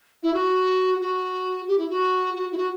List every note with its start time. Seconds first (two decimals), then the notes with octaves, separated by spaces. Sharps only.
0.23 E4
0.34 F#4
1.01 F#4
1.68 G4
1.78 E4
1.90 F#4
2.35 F#4
2.52 E4
2.57 F#4